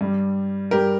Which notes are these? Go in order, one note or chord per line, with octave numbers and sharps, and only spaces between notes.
G2 G3
G2 G3 G4 A#4